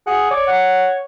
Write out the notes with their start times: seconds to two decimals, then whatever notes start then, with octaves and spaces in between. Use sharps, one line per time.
0.07 G#4 F#5
0.31 C#5 D5
0.47 F#5